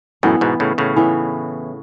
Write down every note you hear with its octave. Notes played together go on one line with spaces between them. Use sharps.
F#2 A2 E3 B3 E4
G#2 B2
A2 C#3
A2 C#3
E3 B3 E4